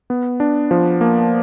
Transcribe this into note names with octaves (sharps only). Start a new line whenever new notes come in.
B3
D4
F3
A#3